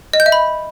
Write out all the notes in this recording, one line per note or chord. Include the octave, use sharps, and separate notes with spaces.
D#5
G6
E5
B5